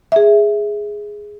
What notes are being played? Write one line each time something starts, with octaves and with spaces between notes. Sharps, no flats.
G#4 E5